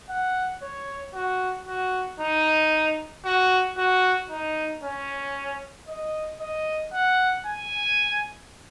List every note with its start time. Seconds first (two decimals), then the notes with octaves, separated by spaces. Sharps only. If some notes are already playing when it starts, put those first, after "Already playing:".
0.09 F#5
0.62 C#5
1.14 F#4
1.67 F#4
2.20 D#4
3.25 F#4
3.77 F#4
4.30 D#4
4.83 C#4
5.88 D#5
6.40 D#5
6.93 F#5
7.46 G#5